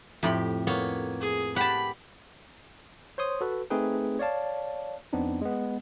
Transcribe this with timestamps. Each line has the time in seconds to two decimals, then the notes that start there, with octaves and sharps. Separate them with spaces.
0.23 F2 A2 G4 B5
0.67 A#3 B3 C#5
1.21 G#4
1.56 G4 F#5 A5 B5
3.18 C5 C#5 C6 D#6
3.41 F#4 A4 B4
3.70 A3 C4 D#4 G#4 B4 G5
4.19 C#5 D5 F5 A5
5.13 F2 B3 C4 D4 D#4
5.41 G#3 B3